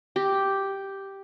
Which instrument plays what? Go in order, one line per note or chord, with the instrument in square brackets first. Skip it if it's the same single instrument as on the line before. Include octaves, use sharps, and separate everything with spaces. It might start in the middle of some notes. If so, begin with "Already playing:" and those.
[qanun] G4